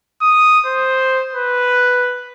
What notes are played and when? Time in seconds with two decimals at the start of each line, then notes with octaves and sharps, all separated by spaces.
0.22 D#6
0.66 C5
1.33 B4